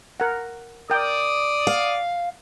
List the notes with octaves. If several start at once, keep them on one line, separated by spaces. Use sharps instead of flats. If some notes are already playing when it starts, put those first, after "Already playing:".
A#4 F#5
A#4 D5 G5 D#6
F5